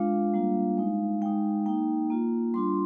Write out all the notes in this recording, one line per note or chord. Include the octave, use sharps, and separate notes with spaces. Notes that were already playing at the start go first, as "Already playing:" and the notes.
Already playing: G#3 D4 F4 F5
G3 A#3 D4 F4
G#3 D#4
G#3 D#4 G5
A#3 D#4 G5
A#3 F4
G3 D4 F4 C6